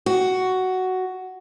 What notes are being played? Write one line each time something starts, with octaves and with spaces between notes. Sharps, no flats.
F#4